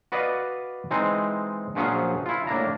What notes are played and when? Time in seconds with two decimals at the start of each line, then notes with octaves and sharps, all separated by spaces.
0.12 F#4 B4 D5 D#5 F5
0.91 E3 G#3 C4 D#4
1.75 A#1 F3 F#3 C#4 G#4 F5
2.26 E4 F4
2.47 A2 A#3 D4 A#5